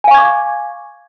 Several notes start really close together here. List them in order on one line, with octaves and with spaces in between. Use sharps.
G#5 F5 C#6 G#6 D6